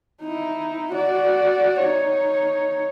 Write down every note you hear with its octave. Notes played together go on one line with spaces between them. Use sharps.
D#4 E4
F#4 D5
D#4 C#5